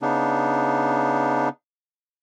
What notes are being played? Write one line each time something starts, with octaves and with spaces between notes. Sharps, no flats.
C#3 B3 D4 D#4